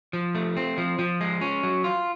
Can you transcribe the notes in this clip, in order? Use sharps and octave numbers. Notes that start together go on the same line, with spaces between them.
F3
A3
C4
F3
F3
G#3
C#4
F#3
F4